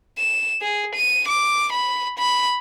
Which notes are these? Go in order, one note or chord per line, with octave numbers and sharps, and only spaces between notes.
E7
G#4
D#7
D6
B5
B5